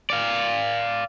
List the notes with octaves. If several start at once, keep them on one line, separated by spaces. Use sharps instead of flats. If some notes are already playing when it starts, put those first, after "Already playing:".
D5 F5